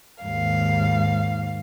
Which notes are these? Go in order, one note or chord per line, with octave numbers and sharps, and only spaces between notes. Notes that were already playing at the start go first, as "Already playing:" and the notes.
D#2 G#2 F5